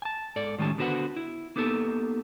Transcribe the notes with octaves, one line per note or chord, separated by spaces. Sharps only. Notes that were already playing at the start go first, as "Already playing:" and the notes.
G#5 A5
G#2 A4 D5
A2 D#3 G#3 C#4 G4 A5
D3 B3 F#4 B4 C5 F#5
E4
A#3 B3 D#4 G4 A4